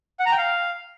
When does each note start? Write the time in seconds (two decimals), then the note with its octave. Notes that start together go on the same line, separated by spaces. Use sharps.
0.20 F#5
0.26 A#5
0.32 G5
0.38 F5